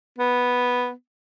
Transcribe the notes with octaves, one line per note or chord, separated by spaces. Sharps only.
B3